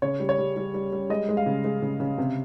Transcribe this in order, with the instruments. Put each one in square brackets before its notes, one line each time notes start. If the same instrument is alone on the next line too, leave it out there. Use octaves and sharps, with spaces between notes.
[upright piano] C#3 C#5
G3
C#5
G3
G3
G3
G3
G#3 D#5
G#3
F5
C#3
G#3
C#3
C#3
C3